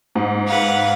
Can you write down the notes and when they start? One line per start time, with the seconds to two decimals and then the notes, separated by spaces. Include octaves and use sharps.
0.15 G#2
0.46 B4 F5 F#5